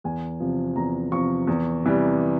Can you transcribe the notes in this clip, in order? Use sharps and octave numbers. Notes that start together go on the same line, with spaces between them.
E2 G#5
C3 F3
E2 A#5
C3 F3 C#6
E2
C3 E3 G3